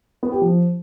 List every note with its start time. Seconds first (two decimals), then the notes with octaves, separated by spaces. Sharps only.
0.23 B3
0.32 G4
0.41 F3